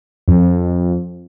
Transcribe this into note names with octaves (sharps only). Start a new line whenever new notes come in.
F2